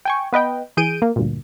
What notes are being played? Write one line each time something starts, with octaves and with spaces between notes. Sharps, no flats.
G5 G#5 C#6
B3 B4 D#5 G5
E3 G#4 G6 D7 D#7
A#3
D2 G2 A#2